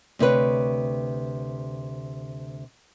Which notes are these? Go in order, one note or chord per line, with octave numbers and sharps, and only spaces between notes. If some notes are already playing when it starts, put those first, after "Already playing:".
D2 C3 D#4 B4 C#5